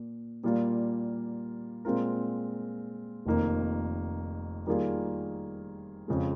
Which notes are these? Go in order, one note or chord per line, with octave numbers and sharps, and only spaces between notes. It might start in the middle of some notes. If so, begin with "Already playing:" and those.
Already playing: A#2
A#2 G3 A#3 F4
A#2 G#3 C4 F4 A#4
F1 F2 D#3 A#3
D#3 G3 A#3 F4 G#4
F2 C#3 F3 G#3